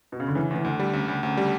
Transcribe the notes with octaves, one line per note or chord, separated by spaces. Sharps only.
B2
C#3
D3
C#3 E3
D2 E3
D2 D3
G3
D2 C#3
D2
D2 C#3
G3